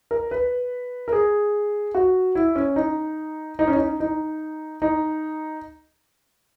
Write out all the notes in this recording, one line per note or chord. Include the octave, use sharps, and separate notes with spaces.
A#4
B4
A#4
G#4
F#4
E4
C#4
D#4
D#4
C#4
D#4
D#4
D#4